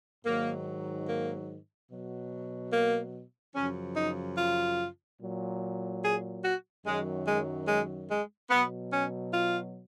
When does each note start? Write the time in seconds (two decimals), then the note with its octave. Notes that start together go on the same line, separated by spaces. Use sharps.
0.25 G#2 D#3 F#3 A#3
1.08 A#3
1.90 B2 F#3
2.73 A#3
3.55 F#2 C#3 F3 C#4
3.97 D#4
4.38 F4
5.20 A#2 F#3
6.03 G#4
6.44 F#4
6.86 F#2 D#3 F#3 G#3
7.27 G#3
7.68 G#3
8.09 G#3
8.50 B2 F#3 B3
8.92 C#4
9.34 F4